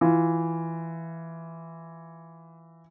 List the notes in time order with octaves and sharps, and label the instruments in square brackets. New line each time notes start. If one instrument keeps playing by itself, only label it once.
[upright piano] E3 F4